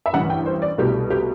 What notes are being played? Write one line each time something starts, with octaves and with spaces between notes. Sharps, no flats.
E5
A1 G2 E3 F#5
G5
C5
D5
C2 B2 A3 G4
G4